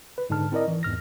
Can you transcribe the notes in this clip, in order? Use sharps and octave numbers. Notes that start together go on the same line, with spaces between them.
B4
G#2 D3 D#4 A5 F6
C4 E4 A#4 D5 D#5
E3
E2 G#2 F6 A#6